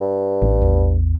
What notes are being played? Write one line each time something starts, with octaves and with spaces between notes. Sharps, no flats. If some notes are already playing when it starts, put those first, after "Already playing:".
G2
A1 A3
E2